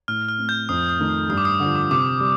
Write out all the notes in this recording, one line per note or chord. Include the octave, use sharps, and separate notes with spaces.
A2 F6
F6
A3 C4
G6
F2 D#6
D#6
D#3 A3 D#4
D#6
G2 D#6
D6
D#6
D3 F3
D6
C3 D6
G3